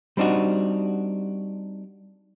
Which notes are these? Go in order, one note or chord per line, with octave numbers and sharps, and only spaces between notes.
G3 C4 D4 D#4 F#4